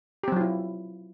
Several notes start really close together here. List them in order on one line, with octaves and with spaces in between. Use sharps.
G4 C4 F#3 F4 E4